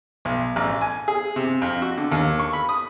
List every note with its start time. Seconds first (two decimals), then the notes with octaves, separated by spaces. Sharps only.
0.25 B1
0.56 A1
0.81 G#5
1.08 G#4
1.36 C3
1.62 F2
1.82 F#4
1.97 D3
2.12 D#2
2.40 C#6
2.53 B5
2.69 D#6